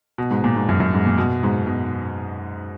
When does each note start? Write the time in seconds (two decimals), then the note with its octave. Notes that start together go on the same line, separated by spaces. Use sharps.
0.18 B2
0.31 G#2
0.44 A#2
0.56 G#2
0.69 F#2
0.80 F#2
0.93 G#2
1.05 A#2
1.18 B2
1.43 G#2
1.67 B2